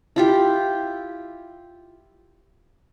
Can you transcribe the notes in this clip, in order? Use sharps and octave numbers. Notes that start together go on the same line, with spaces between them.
E4 F4 G4